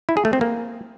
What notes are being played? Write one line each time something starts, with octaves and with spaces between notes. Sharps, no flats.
E4
G#4
A3
C4
A#3